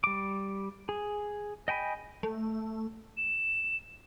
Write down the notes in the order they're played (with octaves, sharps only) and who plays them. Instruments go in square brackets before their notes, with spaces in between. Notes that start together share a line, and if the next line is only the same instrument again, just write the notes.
[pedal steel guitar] G3 D6
G#4
D#5 G5 G#5 B5
[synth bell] A3
[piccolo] E7